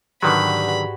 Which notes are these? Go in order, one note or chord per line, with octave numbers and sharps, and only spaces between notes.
G#2 D3 D#3 F#3 G3 B3 B4 B5
F#4 G#4 C5